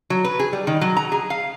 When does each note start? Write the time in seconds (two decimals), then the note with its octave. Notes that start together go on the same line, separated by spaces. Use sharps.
0.10 F#3
0.25 B4
0.40 G#4
0.53 G3
0.67 D#3
0.81 F#3
0.97 A#5
1.12 G#4
1.30 F5